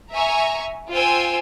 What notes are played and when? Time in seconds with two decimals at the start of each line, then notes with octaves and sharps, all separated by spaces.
0.12 E5 G#5 A#5 C#6
0.91 F4 C5 G5 G#5 C6 E6